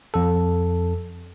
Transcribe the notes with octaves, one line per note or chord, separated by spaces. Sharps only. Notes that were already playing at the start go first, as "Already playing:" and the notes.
F2 A4